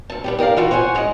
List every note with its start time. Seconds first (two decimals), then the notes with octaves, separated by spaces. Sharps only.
0.10 D2 A5
0.24 G3 B3 G4
0.39 G4 A#4 D5 F5
0.56 E3 F4 F#4 B4
0.71 C5 C#5 F#5 G#5
0.95 F#2 G#3 B4 D#5